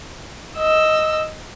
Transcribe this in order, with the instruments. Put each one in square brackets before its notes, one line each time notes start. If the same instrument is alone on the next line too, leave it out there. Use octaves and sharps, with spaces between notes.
[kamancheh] D#5 E6